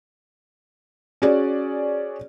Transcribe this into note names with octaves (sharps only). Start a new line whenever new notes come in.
C#4 F#4 G#4 D5